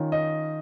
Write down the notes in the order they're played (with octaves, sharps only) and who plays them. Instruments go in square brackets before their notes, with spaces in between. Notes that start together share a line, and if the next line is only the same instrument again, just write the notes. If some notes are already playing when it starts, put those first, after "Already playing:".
Already playing: [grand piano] D#3 C#4 F4
D#5